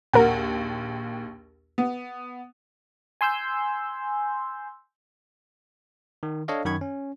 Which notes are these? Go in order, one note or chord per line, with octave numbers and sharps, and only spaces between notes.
A#1 D#2 A#4 F#5
B3
G#5 C6 E6 G6
D#3
D4 A4 C#5 D#5 F5
F#2 D#3 B5 C#6 G#6
C#4